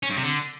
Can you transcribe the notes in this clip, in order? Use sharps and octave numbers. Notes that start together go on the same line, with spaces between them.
C#4
G2
C3
D3